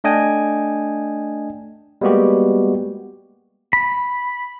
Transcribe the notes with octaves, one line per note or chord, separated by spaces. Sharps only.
A3 D4 D#5 G5 G#5
G3 G#3 A#3 B3 F#4 G4
B5